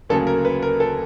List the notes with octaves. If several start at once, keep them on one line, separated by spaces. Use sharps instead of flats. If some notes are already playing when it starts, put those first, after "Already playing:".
D2 C#3 F#3 A#3 C#4 A4
A#4
B4
A#4
A4